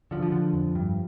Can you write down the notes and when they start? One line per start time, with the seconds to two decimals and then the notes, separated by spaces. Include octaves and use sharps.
0.11 D3 F3
0.23 F3
0.32 D3
0.53 F2
0.75 G2